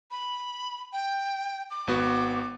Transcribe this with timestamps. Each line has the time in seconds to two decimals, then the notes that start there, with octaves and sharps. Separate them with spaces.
0.11 B5
0.93 G5
1.71 D6
1.87 G#1 B3 F#4